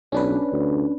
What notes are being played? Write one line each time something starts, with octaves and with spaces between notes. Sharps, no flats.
B1 C#4 D4 B4
D2